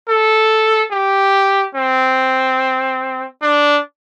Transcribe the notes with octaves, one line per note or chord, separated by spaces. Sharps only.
A4
G4
C4
D4